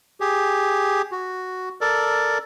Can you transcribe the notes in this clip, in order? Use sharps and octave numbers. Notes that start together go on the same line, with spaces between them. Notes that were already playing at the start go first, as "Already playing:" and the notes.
G4 G#4
F#4
A4 A#4 D5